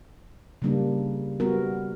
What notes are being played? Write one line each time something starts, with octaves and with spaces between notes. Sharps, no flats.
C#3 G3 A#3 D4
G3 B3 F#4 A#4